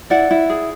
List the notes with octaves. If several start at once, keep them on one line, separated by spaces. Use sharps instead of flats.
E4 D5 F#5
E4
G#4